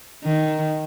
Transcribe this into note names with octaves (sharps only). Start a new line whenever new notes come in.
D#3